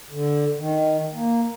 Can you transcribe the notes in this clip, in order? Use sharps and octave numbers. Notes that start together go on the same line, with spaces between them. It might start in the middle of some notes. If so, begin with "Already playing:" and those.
D3
D#3
A#3